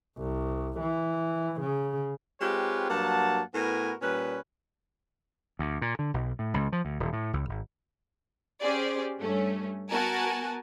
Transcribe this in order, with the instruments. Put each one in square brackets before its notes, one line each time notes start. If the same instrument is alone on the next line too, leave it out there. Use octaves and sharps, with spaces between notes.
[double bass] C2
E3
C#3
[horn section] G#3 C4 F4 G4 B4 C#5
G2 F#3 A#3 F#5 A5
A2 B3 F#4 A#4 B4 G#5
A#2 G3 C#4 B4
[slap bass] D2
A#2
D3
B1
A2
C#2
F3
D2
D#1
A2
C#2
G#1
[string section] C#4 G4 G#4 C5 D5
G2 A3 C#4
B3 F#4 A#4 G#5 A5